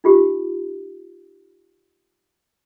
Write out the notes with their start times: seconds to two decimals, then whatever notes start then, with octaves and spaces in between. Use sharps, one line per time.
0.04 D#4 F4 G4